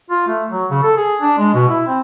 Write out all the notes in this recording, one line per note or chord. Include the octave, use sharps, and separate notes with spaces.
F4
A3
F#3
C#3
A4
G#4
D4
G#3
B2
E4
C4